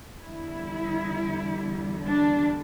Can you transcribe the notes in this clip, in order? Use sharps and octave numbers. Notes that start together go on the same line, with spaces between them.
E2 D3 G3 E4
D4